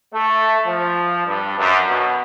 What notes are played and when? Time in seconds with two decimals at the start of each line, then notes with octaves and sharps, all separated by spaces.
0.12 A3
0.65 F3
1.26 G2
1.58 F#2
1.88 B2